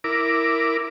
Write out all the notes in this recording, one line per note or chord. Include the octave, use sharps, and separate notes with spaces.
E4 A#4 D6